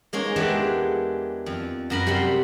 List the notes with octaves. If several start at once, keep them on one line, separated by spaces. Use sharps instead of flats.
G#3 A#3 C#4 D#4
E2 E3 G#3 D4 G4 F#5
F2
F#2 A#4 B5
C3 G3 F#5 B5 C6